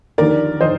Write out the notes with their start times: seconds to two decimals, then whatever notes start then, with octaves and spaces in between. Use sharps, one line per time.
0.18 D#2 D3 F3 A#4 D5
0.60 D3 F3 C5 D#5